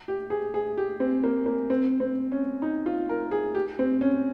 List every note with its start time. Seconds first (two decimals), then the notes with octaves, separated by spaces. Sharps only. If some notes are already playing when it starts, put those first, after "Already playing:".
0.08 G4
0.30 G#4
0.54 G#4
0.77 G4
1.00 C4
1.24 A#3
1.46 A#3
1.70 C4
2.00 C4
2.32 C#4
2.62 D#4
2.86 F4
3.09 A#4
3.31 G#4
3.55 G4
3.79 C4
4.01 C#4